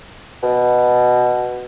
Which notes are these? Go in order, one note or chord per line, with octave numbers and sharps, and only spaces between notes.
B2